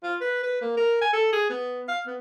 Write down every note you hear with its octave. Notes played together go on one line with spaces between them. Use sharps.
F4
B4
B4
A#3
A#4
G#5
A4
G#4
B3
F5
B3